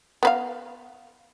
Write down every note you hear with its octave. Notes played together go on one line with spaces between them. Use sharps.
B3 B4 F5